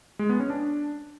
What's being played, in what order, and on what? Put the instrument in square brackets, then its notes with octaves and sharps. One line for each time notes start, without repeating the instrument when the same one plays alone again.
[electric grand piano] G#3
B3
C#4
D4